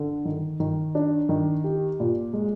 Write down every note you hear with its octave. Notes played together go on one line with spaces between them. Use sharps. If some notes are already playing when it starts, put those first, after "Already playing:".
Already playing: D3
D#3
D#3
D4
D#3
G4
A#2
G#3